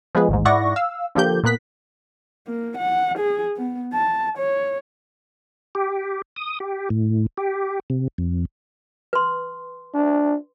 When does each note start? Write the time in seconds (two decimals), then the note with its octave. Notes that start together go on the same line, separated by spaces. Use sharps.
0.15 F3 G#3 B3 G#4 B4
0.29 A1 D#2 G#2
0.45 G#2 E4 D5 F#5 C#6 A#6
0.76 F5 E6
1.15 D3 F3 A#3 G4 G6
1.43 A#2 A#3 B3 F#6 B6
2.47 A#3
2.78 F#5
3.18 G#4
3.57 B3
3.94 A5
4.38 C#5
5.75 G4
6.36 D#6
6.60 G4
6.90 A2
7.38 G4
7.90 C3
8.18 F2
9.13 B4 C6
9.94 D4